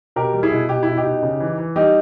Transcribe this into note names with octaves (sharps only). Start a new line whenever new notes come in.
B2 G4 A#4
G3
E4 G#4
B2
B2 G4
B2 E4
D#4 G4
B2
C#3
E3
E3
G3 D#4 G4